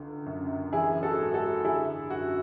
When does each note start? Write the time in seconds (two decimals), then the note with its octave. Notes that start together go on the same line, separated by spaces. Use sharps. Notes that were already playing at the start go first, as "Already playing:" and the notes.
Already playing: C#2 D3
0.26 F#2
0.72 E3 E4 G#4
1.03 F#4 A4
1.19 G#2
1.34 F#4 A4
1.64 D3 E4 G#4
2.10 F#2 F#4